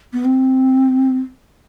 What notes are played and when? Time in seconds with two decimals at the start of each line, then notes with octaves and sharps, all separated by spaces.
0.13 B3
0.25 C4